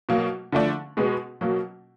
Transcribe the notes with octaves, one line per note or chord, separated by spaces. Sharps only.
B2 F#3 A#3
D3 F3 A3 D4
B2 G#3 B3
B2 F#3 A#3